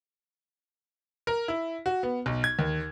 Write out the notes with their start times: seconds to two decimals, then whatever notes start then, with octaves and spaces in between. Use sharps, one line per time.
1.27 A#4
1.48 E4
1.86 F#4
2.03 B3
2.26 B1
2.44 G#6
2.59 D#2